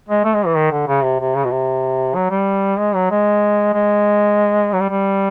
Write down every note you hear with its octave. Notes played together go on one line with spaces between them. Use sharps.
G#3
A3
G#3
E3
D#3
D3
C#3
C3
C3
C#3
B2
C3
F#3
G3
G#3
F#3
G#3
G#3
F#3
G3
G3